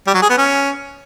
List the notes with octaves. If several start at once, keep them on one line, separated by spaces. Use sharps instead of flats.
G3
F#3
G#4
B3
C#4